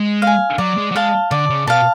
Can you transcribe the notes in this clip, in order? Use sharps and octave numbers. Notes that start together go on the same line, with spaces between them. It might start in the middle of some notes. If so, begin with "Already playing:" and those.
Already playing: G#3
F5 G#5
F#3 D5
G#3
F#3
G#3 F5 A5
D3 D5
C#3
B2 F5 A5